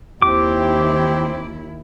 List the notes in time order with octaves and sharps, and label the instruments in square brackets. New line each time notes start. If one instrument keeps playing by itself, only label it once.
[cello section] D#2 E4 [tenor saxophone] C4 [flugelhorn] G4 [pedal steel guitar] D6